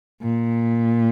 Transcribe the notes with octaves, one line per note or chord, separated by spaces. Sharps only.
A#2